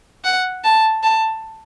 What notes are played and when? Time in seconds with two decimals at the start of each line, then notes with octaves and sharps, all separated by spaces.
0.24 F#5
0.64 A5
1.03 A5